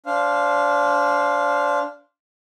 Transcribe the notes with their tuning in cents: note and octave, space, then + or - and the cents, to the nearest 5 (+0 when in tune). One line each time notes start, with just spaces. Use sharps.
D4 -20 C5 +0 F5 +0